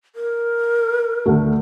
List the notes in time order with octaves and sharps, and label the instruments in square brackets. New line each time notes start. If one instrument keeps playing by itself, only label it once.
[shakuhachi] A#4
[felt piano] D2 A3